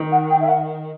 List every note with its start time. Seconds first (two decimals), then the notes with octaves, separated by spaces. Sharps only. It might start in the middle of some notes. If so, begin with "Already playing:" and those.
Already playing: D#3
0.12 F#5
0.30 G5
0.41 E5
0.49 F#5